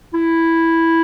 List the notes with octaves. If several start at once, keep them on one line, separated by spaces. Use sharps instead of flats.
E4